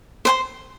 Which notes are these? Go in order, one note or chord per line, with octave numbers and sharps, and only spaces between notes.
C5 G5 C6